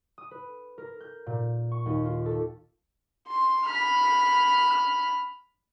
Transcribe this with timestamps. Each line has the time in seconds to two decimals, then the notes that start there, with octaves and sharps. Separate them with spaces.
0.18 D#6
0.31 B4
0.78 A#4
1.01 G6
1.26 A#2
1.72 C#6
1.86 D#2
2.05 F4
2.26 A4
3.28 C6
3.66 B5 F6